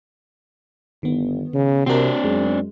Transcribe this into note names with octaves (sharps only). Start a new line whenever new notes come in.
G1 D#3 B3
C#3
C3 C4 D4 F#4 A#4
F#2 G#3